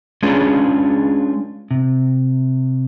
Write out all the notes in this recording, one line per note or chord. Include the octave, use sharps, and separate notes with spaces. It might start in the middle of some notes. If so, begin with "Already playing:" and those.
G#3 C#4 D4 F4 G#4 B4
C3